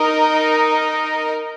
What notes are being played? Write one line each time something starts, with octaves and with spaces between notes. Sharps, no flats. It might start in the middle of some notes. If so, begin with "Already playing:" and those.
Already playing: D#4 A#4 D#5